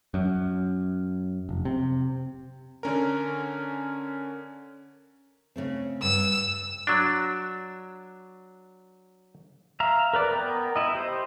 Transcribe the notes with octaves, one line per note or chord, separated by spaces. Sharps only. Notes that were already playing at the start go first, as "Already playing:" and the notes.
F#2
F1
C3
D3 C#4 A#4
C#3 A3 C4
G2 E6
F#3 D4
E5 F5 A#5
A#4 B4 D5
B3 A#4 G5
E4 D#5
G4 C5